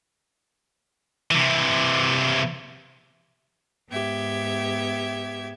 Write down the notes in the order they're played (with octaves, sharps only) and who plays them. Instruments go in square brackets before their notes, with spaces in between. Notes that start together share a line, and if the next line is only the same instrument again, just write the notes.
[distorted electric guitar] C3 E3
[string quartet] G#2 B3 G4 E5 G#6